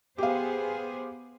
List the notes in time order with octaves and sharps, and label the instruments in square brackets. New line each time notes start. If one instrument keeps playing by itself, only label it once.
[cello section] B3 G#4 C5 [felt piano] G4 F5